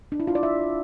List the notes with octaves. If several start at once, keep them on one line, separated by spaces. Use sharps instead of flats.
D4
E4
F4
D5
E5